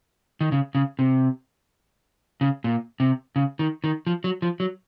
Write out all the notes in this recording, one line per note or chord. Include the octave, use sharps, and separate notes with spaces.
D#3
C#3
C#3
C3
C#3
A#2
C3
C#3
D#3
D#3
F3
F#3
F3
F#3